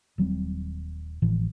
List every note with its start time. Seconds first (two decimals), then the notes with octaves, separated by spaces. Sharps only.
0.18 D#1 F#3 G3 C4
1.22 G#1 A2 E3 F3